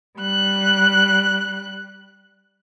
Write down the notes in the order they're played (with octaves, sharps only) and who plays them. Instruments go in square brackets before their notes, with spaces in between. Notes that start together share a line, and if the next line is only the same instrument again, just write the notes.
[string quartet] G3 F#6